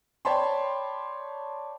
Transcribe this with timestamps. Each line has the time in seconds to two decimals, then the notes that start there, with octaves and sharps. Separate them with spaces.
0.25 C#5 D5 G5 A5 B5 C6